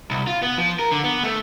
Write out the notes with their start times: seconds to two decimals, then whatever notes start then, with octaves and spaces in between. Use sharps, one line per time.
0.11 C2
0.27 F4
0.42 B3
0.58 F3
0.79 A#4
0.92 D3
1.04 B3
1.24 A3